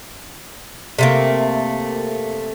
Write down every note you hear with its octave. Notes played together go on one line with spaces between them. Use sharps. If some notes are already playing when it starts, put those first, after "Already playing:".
C3 A3 A#3